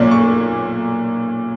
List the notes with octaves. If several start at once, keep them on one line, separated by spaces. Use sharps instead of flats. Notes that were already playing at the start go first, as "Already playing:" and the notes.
Already playing: B1 A#2 A#3 C#4 D5
C#6